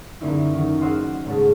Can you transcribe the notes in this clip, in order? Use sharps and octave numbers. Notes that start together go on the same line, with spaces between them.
F#2 D3 A#3 C#4 D#4 E4
D#3 F#3
C5 D#5 F#5 E6 F6
F#1 G#2 A3 C#5 A6